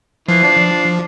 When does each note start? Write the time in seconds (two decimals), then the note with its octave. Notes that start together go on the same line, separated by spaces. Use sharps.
0.28 E3 F3 C7
0.43 D4